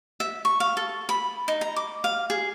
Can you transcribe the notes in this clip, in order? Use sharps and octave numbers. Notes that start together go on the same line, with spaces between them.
E5
C#6
F5
A4
B5
D#4
A#5
D6
F5
G#4